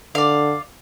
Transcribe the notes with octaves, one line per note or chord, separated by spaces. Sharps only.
D3 D5 F5